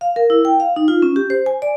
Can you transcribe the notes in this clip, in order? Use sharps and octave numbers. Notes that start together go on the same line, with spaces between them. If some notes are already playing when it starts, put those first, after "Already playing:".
F5
A#4
E4
G5
F5
D#4
F4
C#4
G4
C5
G#5
D5